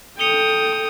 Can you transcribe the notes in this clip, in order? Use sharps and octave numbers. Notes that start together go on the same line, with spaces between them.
A4 G5 D#6 C#7 F7 G7